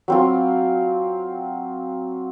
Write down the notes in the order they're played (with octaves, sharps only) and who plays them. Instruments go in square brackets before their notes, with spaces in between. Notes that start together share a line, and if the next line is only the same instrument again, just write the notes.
[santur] F#3 C4 F4